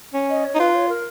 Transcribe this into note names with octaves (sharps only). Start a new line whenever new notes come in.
C#4
D#5
C#5
D#4
F4 B4
C#5
A#4